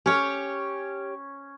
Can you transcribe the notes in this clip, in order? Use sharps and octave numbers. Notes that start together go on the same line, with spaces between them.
C#4 G4 C#5